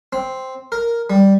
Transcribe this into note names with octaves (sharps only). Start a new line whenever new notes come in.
C4
A#4
G3